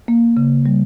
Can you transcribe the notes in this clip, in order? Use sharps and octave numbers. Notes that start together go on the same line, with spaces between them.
A#3
C#3
G3